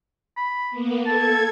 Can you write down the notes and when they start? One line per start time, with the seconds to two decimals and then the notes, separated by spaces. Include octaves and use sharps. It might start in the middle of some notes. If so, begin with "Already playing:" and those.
0.37 B5
0.71 A#3 B3
1.06 A4 A5 G#6